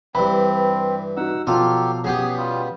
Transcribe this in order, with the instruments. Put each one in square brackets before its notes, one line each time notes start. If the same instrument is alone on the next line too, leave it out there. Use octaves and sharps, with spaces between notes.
[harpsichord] G2 E3 [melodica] C4 [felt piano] B5
[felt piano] D#4 F#4 [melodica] F#5 E6
[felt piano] B2 F3 [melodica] F#3 G4 A4 [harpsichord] F4 F5
[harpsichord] C#3 B3 G4 [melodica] G#4
[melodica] G3 F4